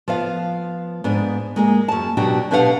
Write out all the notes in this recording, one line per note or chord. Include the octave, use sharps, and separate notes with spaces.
F3 B3 F5
G#2 B3 D4
G#3 A#3 G#4
F#2 A5
B2 F#3 D4 F#4 G4
B2 D4 G4 B4 F5 F#5